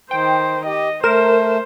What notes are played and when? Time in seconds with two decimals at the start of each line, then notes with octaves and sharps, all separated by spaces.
0.11 D#3 C5 G5
0.66 G4 D#5
1.04 A3 A#4 C5 E7